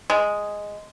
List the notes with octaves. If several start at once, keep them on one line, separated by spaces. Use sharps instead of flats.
G#3